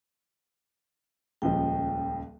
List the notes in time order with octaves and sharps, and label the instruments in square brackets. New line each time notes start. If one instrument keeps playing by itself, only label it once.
[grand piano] D#1 C#2 F3 [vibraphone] G5